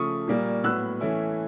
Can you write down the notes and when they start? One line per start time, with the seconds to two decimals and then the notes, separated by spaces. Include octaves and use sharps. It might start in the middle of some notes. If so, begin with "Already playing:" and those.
Already playing: C#3 F3 A3 C#6 D#6
0.28 A#2 G3 A#3
0.64 A2 F#3 B3 E6 F#6
1.01 E3 A3 C#4 E4